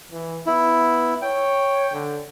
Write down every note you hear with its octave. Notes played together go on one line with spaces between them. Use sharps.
E3
B3 E4
C#5 G5
D3